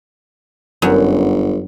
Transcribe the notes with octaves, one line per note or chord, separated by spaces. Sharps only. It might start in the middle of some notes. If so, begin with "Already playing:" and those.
G1 F#2